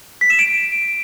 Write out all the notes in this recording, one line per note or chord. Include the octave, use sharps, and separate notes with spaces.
B6
E7
D7